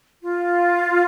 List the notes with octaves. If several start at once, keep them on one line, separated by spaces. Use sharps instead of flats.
F4